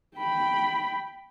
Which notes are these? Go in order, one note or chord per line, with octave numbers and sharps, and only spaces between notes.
G5 B5